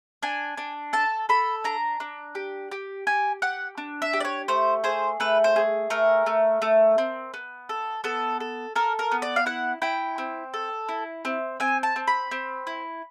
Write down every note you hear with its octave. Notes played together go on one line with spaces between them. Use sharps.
D4 G#5
D4
A4 A5
A4 B5
D4 A#5
D4
G4
G4
G4 G#5
G4 F#5
D4
E5
G4
D5
C#5
A3 C5
G#4 C5
A3 B4
C5
G#4
A3 A#4
A3
A3
C4
B3
A4
B3 A4
A4
A4 A#4
A#4
B3
D5
F5
E4 F#5
E4 G5
C4
A4
E4
C4
C4 G#5
A5
C4
B5
C4
E4